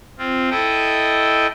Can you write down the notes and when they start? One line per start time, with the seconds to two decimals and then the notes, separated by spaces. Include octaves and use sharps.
0.18 C4 F4
0.50 E4 A4 D#5 G5